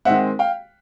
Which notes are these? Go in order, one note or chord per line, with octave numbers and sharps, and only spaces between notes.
D#3 G#3 C4 E5 F#5
F5 G5